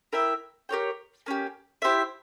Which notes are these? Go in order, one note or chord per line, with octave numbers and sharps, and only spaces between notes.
E4 A#4 E5 G5
G4 A#4 C#5 G5
A#3 C#4 G4
E4 G4 C5 E5